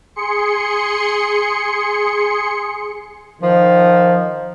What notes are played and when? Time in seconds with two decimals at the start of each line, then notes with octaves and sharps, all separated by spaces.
0.16 G#4 C6 C#7
3.42 D#3 F3